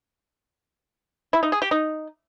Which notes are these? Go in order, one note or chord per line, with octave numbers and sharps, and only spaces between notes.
E4
D#4
G#4
G4
D#4